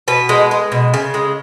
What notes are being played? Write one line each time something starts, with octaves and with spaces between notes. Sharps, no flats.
B2 B4
G#3
G#3
B2
C#3
G#3